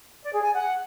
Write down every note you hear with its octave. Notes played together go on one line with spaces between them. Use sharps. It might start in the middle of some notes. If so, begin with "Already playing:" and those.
D5
G#4
G#5
F#5